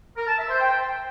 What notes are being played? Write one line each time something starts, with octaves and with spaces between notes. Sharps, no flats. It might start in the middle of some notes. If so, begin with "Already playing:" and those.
A#4
A5
E5
C5
G5